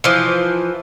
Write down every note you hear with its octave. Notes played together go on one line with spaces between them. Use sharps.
E3 F3